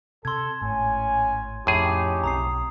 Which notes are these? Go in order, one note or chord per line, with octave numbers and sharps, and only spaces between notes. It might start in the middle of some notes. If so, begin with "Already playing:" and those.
C3 A4 C6 G#6
G#1 A2 C#4 G#5
F2 A2 C#4 D#4 G4 G#4
B1 C4 A#5 D#6 C7